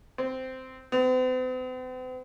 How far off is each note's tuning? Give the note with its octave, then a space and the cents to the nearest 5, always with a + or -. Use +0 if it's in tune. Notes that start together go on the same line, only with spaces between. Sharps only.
C4 -10
C4 -45